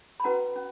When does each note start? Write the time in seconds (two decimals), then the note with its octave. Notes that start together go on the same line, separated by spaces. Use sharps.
0.20 B5
0.24 C#4 F#4 B4 F#5 A#5
0.56 C#4